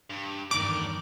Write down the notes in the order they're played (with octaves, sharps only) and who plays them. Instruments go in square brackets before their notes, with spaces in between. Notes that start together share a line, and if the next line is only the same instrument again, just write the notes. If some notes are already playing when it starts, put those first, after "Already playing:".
[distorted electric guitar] G2
[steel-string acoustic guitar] E2 G2 D#3 [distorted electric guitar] A3 D5 [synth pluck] D6